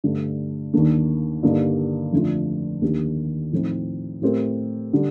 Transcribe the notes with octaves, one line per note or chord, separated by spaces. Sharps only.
G2 D3 A3
D#2 D#3 A#3 D4
G2 D3 G3 A#3 D#4
F2 D3 A3 D4 F4
D#2 D#3 A#3 D4 G4
A2 F3 C4 D#4
A2 A3 C4 G4 A#4
D3 G3